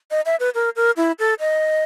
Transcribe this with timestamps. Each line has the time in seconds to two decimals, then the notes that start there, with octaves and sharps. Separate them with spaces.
0.11 D#5
0.26 E5
0.40 B4
0.55 A#4
0.76 A#4
0.97 E4
1.19 A4
1.40 D#5